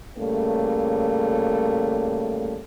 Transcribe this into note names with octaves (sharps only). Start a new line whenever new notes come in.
A2 C#3 G3 A3 A#3